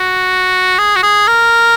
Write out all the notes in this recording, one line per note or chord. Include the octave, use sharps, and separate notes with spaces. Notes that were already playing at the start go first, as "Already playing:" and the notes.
Already playing: F#4
G#4
F#4
G#4
A#4